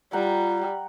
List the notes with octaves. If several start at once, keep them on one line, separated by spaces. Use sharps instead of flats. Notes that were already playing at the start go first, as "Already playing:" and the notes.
G3 F4 F#5 G5 A#5